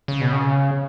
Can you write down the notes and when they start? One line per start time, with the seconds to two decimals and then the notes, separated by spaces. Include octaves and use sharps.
0.08 C#3
0.21 B2
0.33 C#3